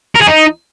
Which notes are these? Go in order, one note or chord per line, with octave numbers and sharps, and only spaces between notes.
A#4
G#4
D#4